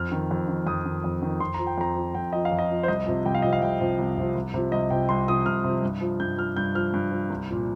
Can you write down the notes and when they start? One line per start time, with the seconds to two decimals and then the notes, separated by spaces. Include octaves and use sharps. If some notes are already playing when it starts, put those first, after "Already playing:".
Already playing: F2 F6
0.12 D#3
0.31 F2
0.48 D#3
0.67 F2 D#6
0.85 D#3
1.04 F2
1.22 D#3
1.40 F2 C6
1.54 F3 A#5
1.67 G5
1.78 F2 A#5
1.96 F3
2.15 F2 G5
2.33 F3 D#5
2.45 F5
2.51 F2
2.59 D#5
2.70 F3
2.83 C5
2.88 C2 D#5
3.06 C3 F3
3.26 C2 G5
3.35 F5
3.42 C3 F3 D#5
3.53 F5
3.62 C2 G5
3.80 C3 F3
3.99 C2
4.18 C3 F3
4.35 C2
4.54 C3 F3
4.72 C2 D#5
4.90 C3 F3 G5
5.09 C2 C6
5.28 C3 F3 D#6
5.46 C2 F6
5.64 C3 F3
5.82 G2
6.01 F3
6.20 G2 G6
6.38 F3 F6
6.56 G2 G6
6.75 F3 F6
6.94 G2
7.11 F3
7.30 C2
7.49 A#2 F3